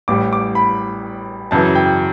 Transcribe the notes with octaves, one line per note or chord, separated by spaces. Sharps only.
A1 A2 G3 D6
D6
B5
F#2 C#3 E3 A5
G5